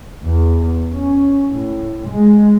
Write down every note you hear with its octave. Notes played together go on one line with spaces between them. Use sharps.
E2
C#4
A2
G#3